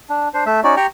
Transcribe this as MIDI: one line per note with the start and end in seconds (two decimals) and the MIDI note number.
0.10 0.28 62
0.34 0.44 62
0.34 0.44 72
0.46 0.60 57
0.46 0.60 76
0.64 0.75 61
0.64 0.75 63
0.64 0.75 66
0.64 0.75 74
0.77 0.86 67
0.77 0.86 79
0.77 0.86 82
0.77 0.86 85